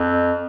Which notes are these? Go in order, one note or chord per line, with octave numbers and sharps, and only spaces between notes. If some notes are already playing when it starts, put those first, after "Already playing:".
Already playing: F2